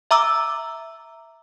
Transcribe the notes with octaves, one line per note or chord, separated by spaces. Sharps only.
E5 A#5 D6 E6